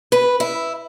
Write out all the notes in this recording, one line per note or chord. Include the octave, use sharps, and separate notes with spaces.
B4
E4